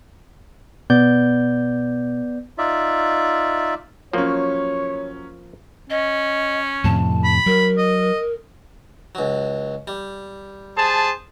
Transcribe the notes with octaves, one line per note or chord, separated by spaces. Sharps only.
B2 B3 D5 G6
D#4 F4 D5 E5
F3 F#3 A#3 C#4 C#5
C#4 D#5
F2 A2 C3 A5
B5
F#3 A#4
D#5
C#2 F#3
G3
G#4 C5 A5